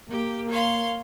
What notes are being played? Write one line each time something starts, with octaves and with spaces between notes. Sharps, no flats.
A#3 G4
C#5 F5 C6